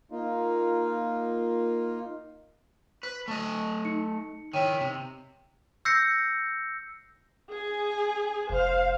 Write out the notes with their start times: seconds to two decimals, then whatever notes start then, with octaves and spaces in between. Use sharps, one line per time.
0.11 A#3 D#4 F4
3.03 B4
3.28 A3 D#5
3.85 D#4 C#7
4.53 D#3 E4 C#5 G5 D#7
4.81 C3
5.85 E6 G6 A#6 C7 C#7
7.49 G#4 G#5
8.50 F1 C5 F5